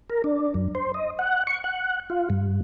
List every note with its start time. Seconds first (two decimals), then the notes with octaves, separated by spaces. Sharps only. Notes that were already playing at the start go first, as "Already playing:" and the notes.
0.10 A#4
0.24 D4
0.54 F#2
0.75 C5
0.94 D#5
1.19 F#5
1.47 C#6
1.64 F#5
2.10 F4
2.30 G2